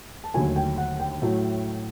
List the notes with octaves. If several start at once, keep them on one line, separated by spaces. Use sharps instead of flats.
A5
D#2 D3 F#3 A3 G#5
G5
F#5
G5
A2 F#3 A3